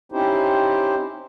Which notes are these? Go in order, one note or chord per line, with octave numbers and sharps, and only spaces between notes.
C4 C#4 D#4 E4 G4 C5